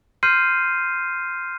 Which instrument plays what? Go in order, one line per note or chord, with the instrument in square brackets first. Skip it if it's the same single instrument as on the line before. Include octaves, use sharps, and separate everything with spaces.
[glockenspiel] C6 F6 G6 C7 D#7